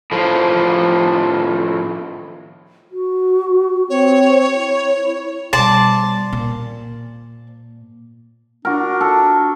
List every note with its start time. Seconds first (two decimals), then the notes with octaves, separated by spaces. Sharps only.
0.12 A2 F3
2.92 F#4
3.90 C4 C#5
4.54 E4
5.53 B2 G3 C5 D5 A5
6.32 A#2
8.65 D4 F#4 A#4
9.01 A4